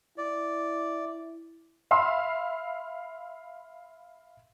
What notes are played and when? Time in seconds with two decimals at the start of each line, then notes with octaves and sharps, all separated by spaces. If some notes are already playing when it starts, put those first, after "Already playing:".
0.18 E4 D5
1.91 E5 F5 B5 C6 E6